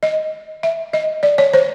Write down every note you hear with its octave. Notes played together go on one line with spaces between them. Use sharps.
D#5
E5
D#5
D5
C#5
C5